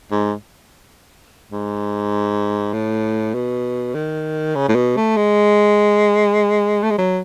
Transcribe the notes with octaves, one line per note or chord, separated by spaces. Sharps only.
G#2
G#2
A2
B2
D#3
C#3
A2
B2
A3
G#3
A3
G#3
F#3